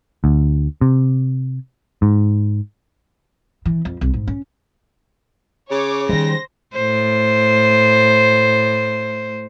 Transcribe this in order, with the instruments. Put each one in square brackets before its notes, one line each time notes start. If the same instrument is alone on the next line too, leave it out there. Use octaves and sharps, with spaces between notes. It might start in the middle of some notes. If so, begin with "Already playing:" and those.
[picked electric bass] D2
C3
G#2
[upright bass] E3
F2
C2
G#2
C#4
[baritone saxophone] C#3 [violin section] C#5 D6
[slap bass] D#3 G3 [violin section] C5 A#6
[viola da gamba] A2 C5